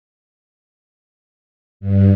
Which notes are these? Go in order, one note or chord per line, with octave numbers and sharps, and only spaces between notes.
G2